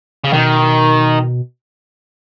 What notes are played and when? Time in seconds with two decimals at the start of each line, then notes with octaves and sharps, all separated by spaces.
0.24 C#3
0.32 B2 D#3